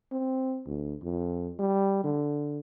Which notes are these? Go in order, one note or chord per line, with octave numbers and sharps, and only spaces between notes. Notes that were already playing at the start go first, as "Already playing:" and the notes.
C4
D2
F2
G3
D3